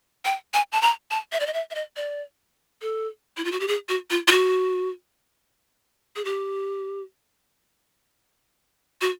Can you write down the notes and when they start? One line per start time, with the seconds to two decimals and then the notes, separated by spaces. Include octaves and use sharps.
0.25 G5
0.54 G#5
0.72 A5
0.82 A#5
1.11 A5
1.32 E5
1.40 D5
1.47 D#5
1.53 E5
1.71 E5
1.75 D#5
1.96 D5
2.82 A4
3.37 E4
3.45 F4
3.52 F#4
3.60 G4
3.68 G#4
3.89 F#4
4.10 F4
4.28 F4
4.32 F#4
6.16 G#4
6.25 G4
9.01 F#4